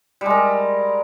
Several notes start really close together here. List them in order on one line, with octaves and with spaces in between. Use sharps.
G3 G#3 A#4